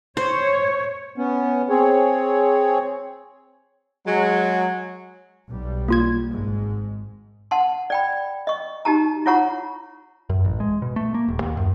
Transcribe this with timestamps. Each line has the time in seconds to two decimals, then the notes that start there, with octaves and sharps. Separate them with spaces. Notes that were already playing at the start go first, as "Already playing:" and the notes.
0.17 C5 C#5
1.18 B3 C#4
1.69 C4 G#4 C#5
4.07 F#3 G#3
5.48 B1 G3
5.88 A#3 F4 G#6
6.28 G#1 G#2 G#3
7.51 F#5 A5 C6
7.90 D5 G5 B5
8.47 D#5 C#6
8.85 D#4 F#4 G4 A5 A#5
9.26 E4 F4 C#5 F#5 A#5 C#6
10.30 F#2
10.45 A1
10.60 G#3
10.82 B2
10.96 A3
11.14 A#3
11.28 D#1
11.41 D#2
11.57 F#2